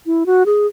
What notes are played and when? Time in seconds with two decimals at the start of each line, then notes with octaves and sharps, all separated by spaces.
0.06 E4
0.26 F#4
0.46 G#4